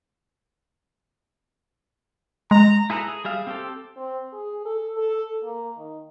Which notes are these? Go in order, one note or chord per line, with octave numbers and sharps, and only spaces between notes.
G#3 A#5
E4 G#4 A4 B4 A#5
G#4
G3 G#4 E5 F5
C4 G4 A4
C4
G#4
A4
A4
A#3
D#3